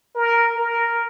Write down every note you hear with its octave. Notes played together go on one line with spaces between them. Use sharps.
A#4
A#4